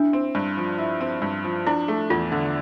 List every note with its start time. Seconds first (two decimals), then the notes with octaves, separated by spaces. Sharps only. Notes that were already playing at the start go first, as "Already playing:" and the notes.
Already playing: D4 E4
0.13 C4
0.35 G2
0.57 F3
0.78 E4
1.01 C4
1.22 G2
1.44 F3
1.67 D4 E4
1.88 A3
2.10 E2 F4
2.32 D3